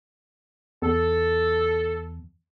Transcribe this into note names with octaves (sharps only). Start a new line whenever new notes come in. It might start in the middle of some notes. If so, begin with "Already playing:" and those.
E2 A4